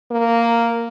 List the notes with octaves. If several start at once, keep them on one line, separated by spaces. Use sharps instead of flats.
A#3